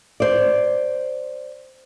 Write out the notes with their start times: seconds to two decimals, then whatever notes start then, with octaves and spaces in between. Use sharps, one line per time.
0.20 C5 D5